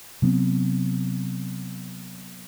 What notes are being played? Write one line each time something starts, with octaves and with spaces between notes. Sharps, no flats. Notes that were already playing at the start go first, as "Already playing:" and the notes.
C3 F#3 B3 C4